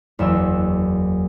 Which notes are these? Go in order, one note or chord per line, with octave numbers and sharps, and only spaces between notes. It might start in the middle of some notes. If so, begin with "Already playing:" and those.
F#1 E2 E5 E6